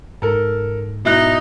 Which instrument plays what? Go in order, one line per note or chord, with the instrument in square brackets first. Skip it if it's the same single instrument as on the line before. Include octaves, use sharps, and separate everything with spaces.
[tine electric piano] G#2 [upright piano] A4 A#4
[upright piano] B2 E4 F#6 [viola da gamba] D#4